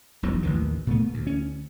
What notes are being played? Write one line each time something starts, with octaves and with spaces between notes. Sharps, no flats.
E1 B1 E2 F#3
A1 D#2 D#3 E3
A#2 A3 B3
D2
D2 C#4